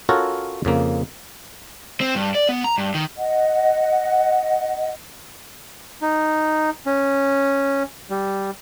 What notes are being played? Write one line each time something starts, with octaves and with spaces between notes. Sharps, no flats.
C#4 F4 F#4 A4 A#4 C#5
F2 C#3 A#3
C4
G2
D5
B3
A#5
G2
D#3
D#5 F#5
D#4
C#4
G3